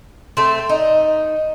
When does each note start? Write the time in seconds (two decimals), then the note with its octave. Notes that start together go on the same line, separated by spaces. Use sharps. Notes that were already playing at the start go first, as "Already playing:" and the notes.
0.37 A3 C4
0.69 D#4